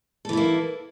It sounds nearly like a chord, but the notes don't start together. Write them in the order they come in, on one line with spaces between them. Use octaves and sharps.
A4 E3 E4 A#3